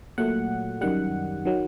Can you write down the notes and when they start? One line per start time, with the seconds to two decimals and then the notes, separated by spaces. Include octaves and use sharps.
0.18 A#2 F#3 A3 F#5
0.81 F#2 D#3 G3 F#5
1.45 D#3 F#3